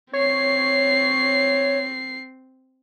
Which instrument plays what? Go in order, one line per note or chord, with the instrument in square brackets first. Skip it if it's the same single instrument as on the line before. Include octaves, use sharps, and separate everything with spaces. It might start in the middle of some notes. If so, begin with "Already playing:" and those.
[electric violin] C4 C7 [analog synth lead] C#5